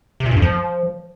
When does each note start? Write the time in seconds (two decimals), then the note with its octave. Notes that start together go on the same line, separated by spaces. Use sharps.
0.20 C3
0.26 A#2
0.31 G2
0.37 F2
0.42 F3